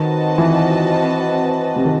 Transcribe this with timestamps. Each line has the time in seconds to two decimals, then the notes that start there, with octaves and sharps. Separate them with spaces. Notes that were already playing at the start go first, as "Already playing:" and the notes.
Already playing: D#3 C4 F#4 B4 D#5 A5
0.38 E3
1.76 C3
1.85 D#3